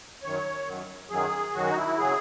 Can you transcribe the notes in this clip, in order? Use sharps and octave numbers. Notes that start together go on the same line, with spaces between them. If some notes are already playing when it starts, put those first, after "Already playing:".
F#2 D#3 F#3 C#5
F#2 D#3 F#3
F#2 D#3 F#3 G#4
F#2 D#3 F#3 F#4
D#4
E4
C#3 F#3 G#4